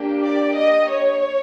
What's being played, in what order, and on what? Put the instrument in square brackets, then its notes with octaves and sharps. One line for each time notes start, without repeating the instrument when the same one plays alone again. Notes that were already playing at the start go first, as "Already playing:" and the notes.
Already playing: [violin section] A#3 D4 G4
D5
D#5
C#5